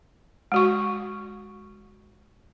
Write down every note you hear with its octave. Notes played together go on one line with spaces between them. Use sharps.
G#3 F#4 C#6